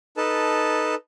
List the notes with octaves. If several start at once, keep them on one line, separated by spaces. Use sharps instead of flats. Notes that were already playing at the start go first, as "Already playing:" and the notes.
D#4 A4 B4 A5